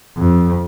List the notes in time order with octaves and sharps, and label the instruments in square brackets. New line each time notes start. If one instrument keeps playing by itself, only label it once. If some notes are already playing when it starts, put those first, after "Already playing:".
[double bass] F2